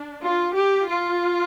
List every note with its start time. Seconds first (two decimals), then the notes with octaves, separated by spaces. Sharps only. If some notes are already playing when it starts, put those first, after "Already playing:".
Already playing: D4
0.21 F4
0.53 G4
0.85 F4